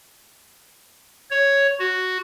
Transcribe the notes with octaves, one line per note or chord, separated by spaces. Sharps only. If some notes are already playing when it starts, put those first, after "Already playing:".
C#5
F#4